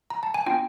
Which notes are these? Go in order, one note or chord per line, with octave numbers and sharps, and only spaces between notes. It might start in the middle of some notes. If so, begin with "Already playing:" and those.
A#5
A5
G#5
B3 D4 F4 G5